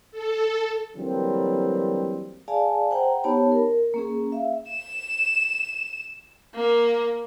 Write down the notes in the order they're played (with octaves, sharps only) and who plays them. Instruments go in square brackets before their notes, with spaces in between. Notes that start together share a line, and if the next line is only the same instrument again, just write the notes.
[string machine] A4
[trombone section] D3 E3 F#3 G3 A#3 C4
[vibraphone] G#4 D5 F5 G#5 A5
C5 F#5 G5 A#5
B3 D#4 G4 C#5 A5 B5
A#4
A#3 C#4 G#4
E5 F5
[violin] E7
A#3